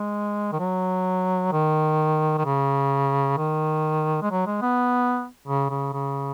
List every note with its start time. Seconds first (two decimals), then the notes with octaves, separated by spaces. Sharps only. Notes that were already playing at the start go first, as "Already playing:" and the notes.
Already playing: G#3
0.52 D#3
0.60 F#3
1.52 D#3
2.38 D#3
2.45 C#3
3.37 D#3
4.22 G#3
4.31 F#3
4.46 G#3
4.62 B3
5.47 C#3
5.70 C#3
5.93 C#3